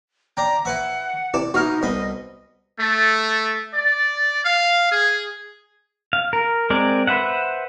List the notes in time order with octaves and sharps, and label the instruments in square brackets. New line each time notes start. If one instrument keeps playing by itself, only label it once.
[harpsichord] D4 G5 [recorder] A#5
[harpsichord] E4 B4 E5 [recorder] F#5
[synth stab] C3 E3 E7 [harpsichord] D5
[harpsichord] B2 E4 [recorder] D#4 [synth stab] F#4 F6
[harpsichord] C2 B2 B5 [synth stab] B3 [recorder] D#5
[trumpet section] A3
D5
F5
G#4
[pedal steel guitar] F5
A#4
G#3 C4 A#4 D5
B4 C5 E5 F#5